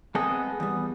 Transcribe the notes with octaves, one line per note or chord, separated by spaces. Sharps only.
G#3 B3 C4 A4 G#5 D#6
E2 G3